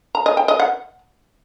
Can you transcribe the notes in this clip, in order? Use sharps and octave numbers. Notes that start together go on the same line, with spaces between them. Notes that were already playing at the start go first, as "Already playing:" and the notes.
A#5
D#5
G5
D#5
F#5